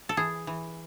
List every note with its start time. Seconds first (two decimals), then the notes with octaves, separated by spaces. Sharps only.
0.09 A4
0.17 E3 G#4
0.47 E3